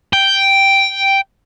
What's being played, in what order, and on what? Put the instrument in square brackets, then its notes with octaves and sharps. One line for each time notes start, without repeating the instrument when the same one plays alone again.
[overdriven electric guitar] G5